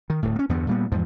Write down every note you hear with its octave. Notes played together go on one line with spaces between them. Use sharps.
D#3
D1 A2
A#3 C#4
E2 G2 D3 B3
A#2 G3 B3
E2 G#2 F3